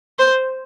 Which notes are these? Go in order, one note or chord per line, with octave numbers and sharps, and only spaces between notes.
C5